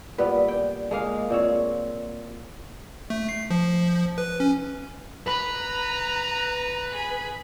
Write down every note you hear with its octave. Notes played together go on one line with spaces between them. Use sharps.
A#2 G3 B3 B4
G5
G#3 A#3 F5
A#2 C4 C#5
A3
C7
F3
B4
C#4
B4 A#5
G#4 B5